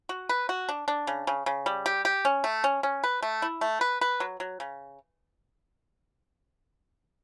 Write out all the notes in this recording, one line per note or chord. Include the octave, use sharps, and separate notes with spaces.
F#4
B4
F#4
D4
D4
C#3
C#3
C#3
G3
G4
G4
C#4
A3
C#4
C#4
B4
A3
E4
A3
B4
B4
F#3
F#3
C#3